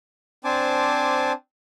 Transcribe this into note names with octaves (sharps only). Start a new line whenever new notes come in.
C4 D4 C5 G#5 A5 D6